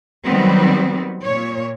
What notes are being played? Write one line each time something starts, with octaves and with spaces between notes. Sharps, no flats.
D#3 F#3 G3 B3 C4
A#2 C#5